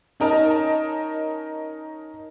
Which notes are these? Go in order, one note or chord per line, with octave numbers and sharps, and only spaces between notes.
C#4 D#4 A#4 D#5 A5